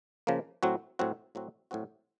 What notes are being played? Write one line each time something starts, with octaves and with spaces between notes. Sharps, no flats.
C#3 F3 A#3
A2 F#3 C4 F#4
A2 F#3 C4 F#4
A2 F#3 C4 F#4
A2 F#3 C4 F#4